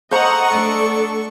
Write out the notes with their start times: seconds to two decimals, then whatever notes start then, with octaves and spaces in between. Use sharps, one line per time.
0.11 A4 C5 D#5 F#5 A#5 C#6
0.51 A3 D4 A4 D5